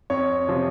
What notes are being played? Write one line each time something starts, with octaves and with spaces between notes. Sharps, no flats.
F2 C#5
C3 F3